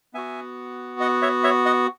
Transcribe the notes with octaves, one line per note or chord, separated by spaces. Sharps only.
B3 F#4 E5 G#5
D#5 F#5
C#5 E5
C#5 E5
D#5 F#5